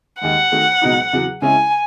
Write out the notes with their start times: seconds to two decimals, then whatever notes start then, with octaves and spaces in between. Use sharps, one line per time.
0.21 D#2 D#3 G#3 F#5
0.52 D#3 A3 D#4 F#4
0.82 C#2 B2 F#3 B3 D#4
1.13 E2 C#3 F#3
1.42 C#3 G#3 C#4 E4 G#5